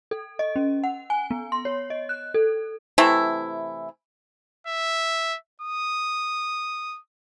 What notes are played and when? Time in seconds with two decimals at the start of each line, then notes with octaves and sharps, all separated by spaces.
0.11 A4
0.39 D#5
0.56 C#4
0.84 F#5
1.10 G#5
1.31 B3
1.52 C6
1.65 C#5
1.90 D#5
2.09 F#6
2.34 A4
2.98 C3 E3 A3 E4
4.67 E5
5.61 D#6